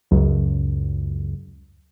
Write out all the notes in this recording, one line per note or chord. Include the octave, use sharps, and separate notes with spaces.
C#2 F#2